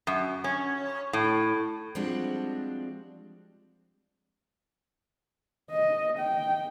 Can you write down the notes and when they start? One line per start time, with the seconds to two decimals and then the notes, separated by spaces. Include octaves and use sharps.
0.07 F#2
0.44 C#4
1.13 A2
1.95 F3 G3 G#3 C4 D4 F#4
5.72 D#5
6.18 G5